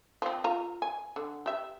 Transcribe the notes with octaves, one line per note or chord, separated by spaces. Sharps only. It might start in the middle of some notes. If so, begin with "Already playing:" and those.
F3 C4
F4 A#5
G#5
D3
G4 E5